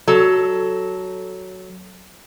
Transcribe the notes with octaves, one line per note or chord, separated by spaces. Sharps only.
F#3 A4